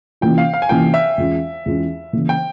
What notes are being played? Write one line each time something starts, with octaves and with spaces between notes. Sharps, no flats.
C3 E3 A#3 C#4 F4 G5
F5
F5
G#5
C3 E3 A#3 C#4 F4 G5
E5
E2 E3 G#3 C#4 F4
E2 E3 G#3 C#4 F4
C#3 E3 A#3
G5